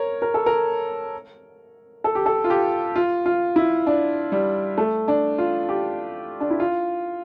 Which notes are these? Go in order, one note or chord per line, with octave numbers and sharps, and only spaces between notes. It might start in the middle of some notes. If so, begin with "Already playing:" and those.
Already playing: A#4 C#5
A#4
A4
A#4
A4
G4
A4
F4
G4
F4
F4
E4
D4
G3
A3
D4
F4
G4
D4
E4
F4